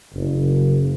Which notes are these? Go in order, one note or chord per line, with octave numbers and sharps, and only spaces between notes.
F#1